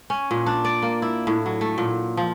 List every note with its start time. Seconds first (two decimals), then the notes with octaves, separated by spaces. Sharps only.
0.10 C#4
0.31 A#2
0.46 D4
0.65 D5
0.82 A#3
1.02 E4
1.27 A2
1.46 F#3
1.61 A3
1.78 A#2
2.17 F3